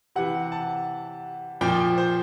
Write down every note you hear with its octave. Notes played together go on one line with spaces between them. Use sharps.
C3 E3 F#5
A5
A#2 F3 G5
C5